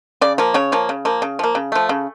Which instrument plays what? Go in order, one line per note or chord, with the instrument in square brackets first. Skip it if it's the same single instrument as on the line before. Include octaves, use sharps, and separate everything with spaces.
[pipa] C#3 D5
F3 A#3
C#3 C#5
F3 A#3
C#3
F3 A#3
C#3
F3 A#3
C#3
F3 A3
C#3